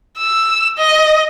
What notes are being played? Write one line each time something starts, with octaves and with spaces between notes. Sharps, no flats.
E6
D#5